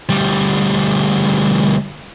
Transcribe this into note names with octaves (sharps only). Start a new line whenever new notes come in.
D2 G3